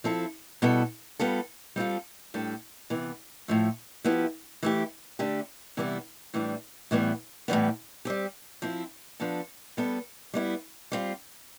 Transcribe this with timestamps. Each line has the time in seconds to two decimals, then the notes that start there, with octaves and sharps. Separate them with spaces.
0.04 F3 C4 E4 A4
0.62 B2 G3 B3 E4 A4
1.19 G3 B3 F4 A4
1.76 G3 C4 F4 A4
2.34 A2 G3 D4 A4
2.90 C3 E3 B3
3.48 A2 F3 A3
4.04 F3 B3 E4 G4
4.63 E3 A3 E4 G4
5.19 D3 A3 D4 G4
5.77 C3 E3 G3 B3 E4
6.34 A2 E3 G3 D4
6.91 A2 E3 G3 B3
7.48 A2 E3 G3 B3
8.05 G3 C4 G4
8.62 F3 C4 E4
9.20 F3 B3 D4 A4
9.77 G3 B3 D4 A4
10.33 G3 B3 E4
10.92 G3 C4 F4